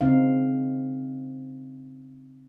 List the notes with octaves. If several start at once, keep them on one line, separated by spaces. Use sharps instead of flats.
C#3 C4 D#4 F5